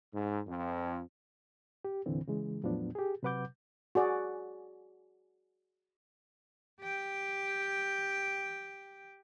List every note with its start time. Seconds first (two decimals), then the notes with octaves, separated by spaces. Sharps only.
0.13 G#2
0.47 F2
1.85 G4
2.06 E2 A#2 D3 E3 C4
2.28 C#3 E3 G#3
2.63 E2 A2 F3 F#3 B3 D4
2.95 G4 G#4
3.23 C3 F#3 B4 F#5 D6 G6
3.95 F#4 G#4 D5
6.81 G4 G5